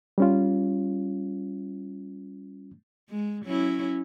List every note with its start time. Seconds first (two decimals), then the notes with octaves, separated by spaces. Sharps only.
0.18 G3 C#4 F4
3.09 G#3
3.45 F#3 C#4 E4